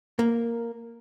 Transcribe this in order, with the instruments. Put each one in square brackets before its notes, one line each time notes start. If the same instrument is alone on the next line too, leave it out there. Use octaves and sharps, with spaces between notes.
[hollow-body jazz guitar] A#3